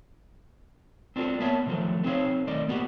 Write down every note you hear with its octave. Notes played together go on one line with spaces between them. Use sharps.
C4 D4 F4 F#4 A4
A#3 B3 C#5 E5 A5
D3 D#3 F3 F#3 A3
A3 C4 D#4 A4 C#5 F5
D#3 A3 D5 D#5
A#3 B3 F#4 G4